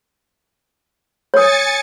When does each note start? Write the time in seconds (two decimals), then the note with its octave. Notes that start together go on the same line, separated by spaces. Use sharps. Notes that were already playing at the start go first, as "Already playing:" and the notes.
1.34 C#5 G#5 D#6 A6 C#7